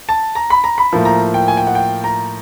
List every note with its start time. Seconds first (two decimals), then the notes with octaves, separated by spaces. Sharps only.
0.09 A5
0.35 A#5
0.50 B5
0.64 A#5
0.78 B5
0.92 A2 F3 A#3
1.05 A#5
1.34 G5
1.48 G#5
1.57 G5
1.67 F#5
1.75 G5
2.04 A#5